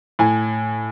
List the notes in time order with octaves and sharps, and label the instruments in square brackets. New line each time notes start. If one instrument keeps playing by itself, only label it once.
[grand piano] A2 G#5